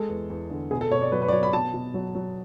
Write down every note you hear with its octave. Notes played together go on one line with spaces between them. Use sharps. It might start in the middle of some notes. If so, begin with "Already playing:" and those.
Already playing: G#3 A4
E2
E2
D3
B2 G#4
A4
B2 C#5
D5
F#3 B4
B4
D5
F#3 C#5
B5
B2 A5
B2
F#3
F#3